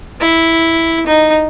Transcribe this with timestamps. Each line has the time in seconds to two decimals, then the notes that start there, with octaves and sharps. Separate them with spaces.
0.21 E4
1.07 D#4